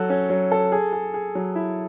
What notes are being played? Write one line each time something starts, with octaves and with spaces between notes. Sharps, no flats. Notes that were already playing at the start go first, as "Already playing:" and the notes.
Already playing: F#3 F#4 A4
C#4
F#3
A4
G#4
G#4
G#4
F#3
E4